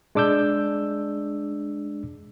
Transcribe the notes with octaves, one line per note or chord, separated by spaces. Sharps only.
G#3 D4 D6 E6 G6